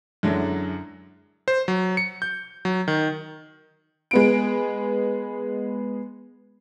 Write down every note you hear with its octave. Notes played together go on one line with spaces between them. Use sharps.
F#2 D3 F#3 G#3 D4 E4
C5
F#3
C#7
G6
F#3
D#3
G#3 B3 D7